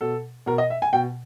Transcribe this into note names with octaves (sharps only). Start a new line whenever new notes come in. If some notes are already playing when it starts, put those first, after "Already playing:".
B2 A4
B2 A#4
D#5
E5
G#5
B2 G5